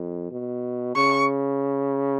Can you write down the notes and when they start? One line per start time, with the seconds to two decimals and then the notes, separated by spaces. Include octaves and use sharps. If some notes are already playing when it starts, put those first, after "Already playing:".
Already playing: F2
0.31 B2
0.96 C#3 C#6